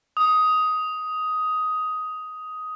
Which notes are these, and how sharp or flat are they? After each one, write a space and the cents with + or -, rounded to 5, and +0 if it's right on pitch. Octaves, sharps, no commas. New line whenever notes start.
D#6 +10